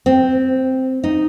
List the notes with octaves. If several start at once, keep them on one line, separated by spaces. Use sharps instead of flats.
C4
D#4